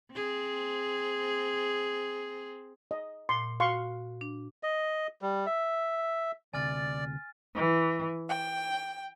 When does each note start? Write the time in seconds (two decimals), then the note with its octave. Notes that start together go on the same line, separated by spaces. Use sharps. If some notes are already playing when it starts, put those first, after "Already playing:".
0.12 C4 G#4
2.91 D#5
3.29 A#2 C6
3.60 F#4 F5 C6 C#6
4.21 D4
4.63 D#5
5.22 G3
5.46 E5
6.54 D2 C3 D5 G#5 F6 A6
7.56 E3
8.29 G5